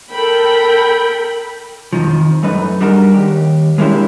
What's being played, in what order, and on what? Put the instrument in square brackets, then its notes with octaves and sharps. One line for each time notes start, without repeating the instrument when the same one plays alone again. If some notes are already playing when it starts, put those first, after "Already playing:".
[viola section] A4 A#4 G5 B5
[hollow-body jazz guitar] F2 A2 D#3 F3
F#2 A3 D#4 B4
G3 D4 D#4 F#4 G#4 A#4
D#2 G4
G#3 A#3 C#4 D4 E4 G4